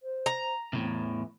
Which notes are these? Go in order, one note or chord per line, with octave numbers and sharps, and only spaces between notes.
C5
A#5
E2 A2 C3 C4
E3